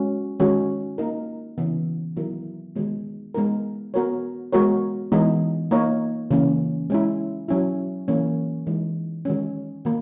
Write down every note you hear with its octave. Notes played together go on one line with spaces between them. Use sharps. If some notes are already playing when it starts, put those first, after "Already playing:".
Already playing: G#3 C#4 F#4
D#3 G#3 C#4 F#4
A#3 D#4 A#4
C#3 E3 B3
D#3 F#3 B3 E4 A#4
D#3 G#3 B3
G#3 B3 D#4 A#4
B3 F#4 A#4 C#5
G#3 B3 F#4 A#4 C#5
E3 G#3 B3 D#4 G#4
A#3 D#4 A#4 C#5
C#3 E3 A#3 C#4
G#3 C#4 E4
F#3 C#4 E4
E3 A#3 C#4
E3 G#3 D#4
D#3 G#3 C#4
D#3 A#3